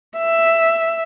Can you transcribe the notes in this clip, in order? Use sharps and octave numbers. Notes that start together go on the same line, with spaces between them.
E5